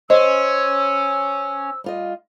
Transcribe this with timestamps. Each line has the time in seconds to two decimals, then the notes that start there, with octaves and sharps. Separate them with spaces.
0.10 C#4 C5 D#5 E6
1.84 G3 F4 D#5